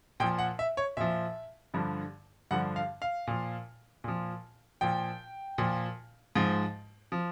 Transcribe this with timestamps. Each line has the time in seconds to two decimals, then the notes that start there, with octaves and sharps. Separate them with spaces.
0.20 A#2 F3 G5
0.39 F#5
0.59 E5
0.77 C#5
0.97 A#2 F3 E5
1.74 G2 D3 F3
2.51 G2 D3 F3 F#5
2.76 F5
3.02 F5
3.27 A#2 F3
4.04 A#2 F3
4.81 A#2 F3 G5
5.58 A#2 F3
6.36 G#2 F3
7.12 F3